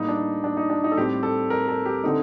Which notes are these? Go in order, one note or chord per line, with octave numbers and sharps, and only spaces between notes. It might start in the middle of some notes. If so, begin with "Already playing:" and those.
Already playing: A2 G3 A#3 D#4
D4
D4
D#4
D4
D#4
A4
A2 G3 C4 G4
A4
A#4
A4
G4
D3 A3 C4 D#4